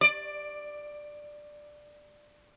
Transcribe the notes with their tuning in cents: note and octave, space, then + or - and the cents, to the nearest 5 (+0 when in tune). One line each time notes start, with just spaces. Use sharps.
D5 +10